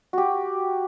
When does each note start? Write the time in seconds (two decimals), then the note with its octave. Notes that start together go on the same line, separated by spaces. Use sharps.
0.13 F#4 G4